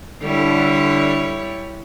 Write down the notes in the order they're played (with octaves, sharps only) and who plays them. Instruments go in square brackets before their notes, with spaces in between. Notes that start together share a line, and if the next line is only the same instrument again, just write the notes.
[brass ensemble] D3 [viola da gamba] G3 E4 C#5